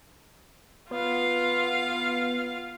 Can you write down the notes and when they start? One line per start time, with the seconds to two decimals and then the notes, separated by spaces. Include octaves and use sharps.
0.91 B3 F4 F5